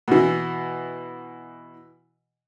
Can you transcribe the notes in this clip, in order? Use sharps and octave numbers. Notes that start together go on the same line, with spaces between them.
B2 E3